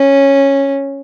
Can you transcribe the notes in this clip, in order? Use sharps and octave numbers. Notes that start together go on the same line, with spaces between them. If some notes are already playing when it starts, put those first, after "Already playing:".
Already playing: C#4